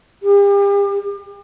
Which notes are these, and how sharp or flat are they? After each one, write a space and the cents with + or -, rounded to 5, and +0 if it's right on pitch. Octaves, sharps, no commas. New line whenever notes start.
G4 +40